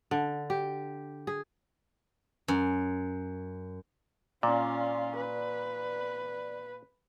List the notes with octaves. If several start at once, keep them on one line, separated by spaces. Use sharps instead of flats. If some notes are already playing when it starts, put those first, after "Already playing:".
D3
G4
G#4
F#2
A#2 C#4 F4 D5
B4